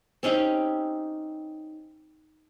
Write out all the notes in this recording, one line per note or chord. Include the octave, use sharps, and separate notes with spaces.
C4 C#4 D#4 G4